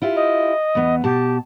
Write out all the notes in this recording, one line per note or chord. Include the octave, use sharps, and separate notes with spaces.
E4 F4 G4
D#5
E2 B3
B2 G4 A5